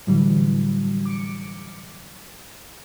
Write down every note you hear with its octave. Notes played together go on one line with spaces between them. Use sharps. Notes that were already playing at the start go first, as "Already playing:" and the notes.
A2 D3 E3 F#3 G3
D6 C#7